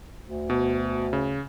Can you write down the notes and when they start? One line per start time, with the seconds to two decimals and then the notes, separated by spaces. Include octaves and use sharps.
0.23 D2
0.50 B2
1.13 C#3